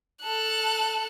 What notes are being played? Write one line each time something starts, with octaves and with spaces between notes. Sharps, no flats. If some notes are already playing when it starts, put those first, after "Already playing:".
A4 F#6